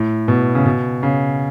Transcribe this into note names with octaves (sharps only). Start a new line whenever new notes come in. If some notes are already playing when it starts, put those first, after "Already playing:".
Already playing: A2
B2
C#3
B2
C#3